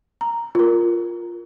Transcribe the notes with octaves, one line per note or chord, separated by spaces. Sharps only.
A#5
F4 A#4